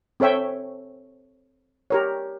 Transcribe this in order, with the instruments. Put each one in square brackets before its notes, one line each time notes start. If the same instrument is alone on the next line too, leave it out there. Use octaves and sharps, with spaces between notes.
[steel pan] C4 A4 C#5 E5 G5
G4 A#4 C#5